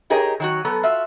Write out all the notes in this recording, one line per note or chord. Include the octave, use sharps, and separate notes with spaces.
D#4 G4 G#4 A#4 C#5 D#5
D#3 F#3 F#4
F#3 B3 A4
F4 F#4 E5